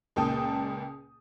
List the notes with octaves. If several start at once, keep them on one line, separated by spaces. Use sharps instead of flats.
C#2 A#2 G5 A5 D#6